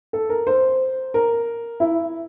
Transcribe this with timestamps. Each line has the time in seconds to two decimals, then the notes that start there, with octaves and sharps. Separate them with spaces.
0.13 A4
0.29 A#4
0.47 C5
1.14 A#4
1.80 E4